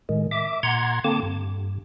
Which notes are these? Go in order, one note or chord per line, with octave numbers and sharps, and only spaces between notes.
A2 D#3 G#3
E5 D6
A#2 F#5 A#5 C6 G#6
D3 A#3 C4 A5 D6
G2